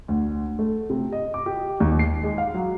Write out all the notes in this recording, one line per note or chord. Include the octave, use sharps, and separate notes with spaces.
D2
A3
C3
D#5
D6
G4
D#2
C7
G#3
F5
F#3